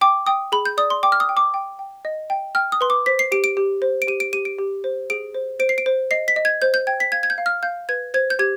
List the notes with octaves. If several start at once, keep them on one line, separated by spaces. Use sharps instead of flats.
G5 D6
G5 D#6
G#4 B5
G6
D5 D#6
C6
G5 D6
F6
D#6
G5
D6
G5
G5
D#5
G5
G5 F6
D#6
B4 C6
D6
C5 B6
C7
G4 D7
D7
G4
C5
D7
G4 D#7
D7
G4 D#7
D7
G4
C5
G#4 D7
C5
C5 D7
C7
D7
C5
D#5 C7
B6
D#5
G#6
C5 G6
G6
G5 G#6
B6
F5 G#6
G#6
G6
F5
F6
F5 G6
B4 G#6
C5 G#6
G6
G4 G#6